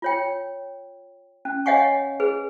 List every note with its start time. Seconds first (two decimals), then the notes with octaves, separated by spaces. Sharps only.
0.02 F4 C#5 G5
1.45 C#4
1.66 C#5 D#5 F5 F#5 G#5 C#6
2.20 G#4 B4